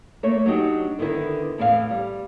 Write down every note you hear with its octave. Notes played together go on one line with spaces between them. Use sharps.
A3 A#3 C#5
F#3 D4 D#4 G4
D3 D#3 B3 E4 A#4
E2 A2 E3 C4 A4 F5
G3